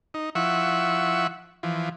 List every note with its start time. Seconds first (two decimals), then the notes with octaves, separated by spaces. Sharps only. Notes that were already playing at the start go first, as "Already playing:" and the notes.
0.14 D#4
0.35 F3 E4 E5 F#5 C#6
1.63 E3 F3